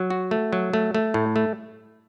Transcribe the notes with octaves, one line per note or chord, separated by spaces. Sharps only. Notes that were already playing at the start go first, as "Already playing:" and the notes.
Already playing: F#3
F#4
A3
F#3
A3
A3
A2
A3